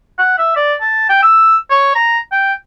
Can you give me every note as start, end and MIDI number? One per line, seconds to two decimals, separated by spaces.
0.18 0.38 78
0.38 0.54 76
0.56 0.74 74
0.81 1.05 81
1.09 1.18 79
1.23 1.57 88
1.70 1.92 73
1.95 2.19 82
2.32 2.53 79